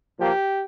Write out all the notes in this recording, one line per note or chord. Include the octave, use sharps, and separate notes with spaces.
A#2 F3 A#3 G4